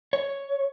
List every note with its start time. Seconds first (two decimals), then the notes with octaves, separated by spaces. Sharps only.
0.13 C#5